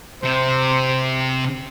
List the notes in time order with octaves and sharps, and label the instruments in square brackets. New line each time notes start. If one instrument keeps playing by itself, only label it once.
[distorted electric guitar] C3 [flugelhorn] C5